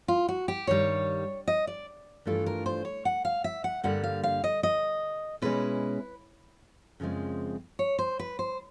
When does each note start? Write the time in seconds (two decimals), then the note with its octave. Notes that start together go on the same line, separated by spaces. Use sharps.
0.08 F4
0.28 F#4
0.48 G4
0.67 G2 D#3 G3 C#5
1.48 D#5
1.67 D5
2.25 G2 E3 A3 D4 F4 A4
2.46 A#4
2.66 C5
2.85 C#5
3.05 F#5
3.25 F5
3.44 E5
3.64 F#5
3.83 G2 D3 G3 A#3 F#5
4.04 F5
4.23 F5
4.44 D#5
4.63 D#5
5.42 B2 G#3 C#4 E4 B4
7.00 F#2 C#3 F3 G#3 C4
7.79 C#5
7.99 C5
8.19 B4
8.39 C5